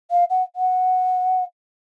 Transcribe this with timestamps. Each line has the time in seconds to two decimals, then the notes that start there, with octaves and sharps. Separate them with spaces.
0.11 F5
0.30 F#5
0.56 F#5